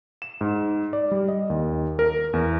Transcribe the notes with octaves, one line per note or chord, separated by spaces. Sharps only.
E7
G#2
D5
G3
D#5
D#2
A#4
E2